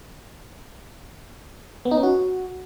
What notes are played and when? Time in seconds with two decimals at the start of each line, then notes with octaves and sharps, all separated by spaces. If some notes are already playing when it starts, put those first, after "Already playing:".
1.85 B3
1.91 D#4
1.97 C#4
2.03 F#4